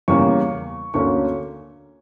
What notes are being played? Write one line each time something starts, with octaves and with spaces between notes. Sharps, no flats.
E2 C#3 G3 A#3 C#4 C#6
D2 D3 A#3 C#4 C#6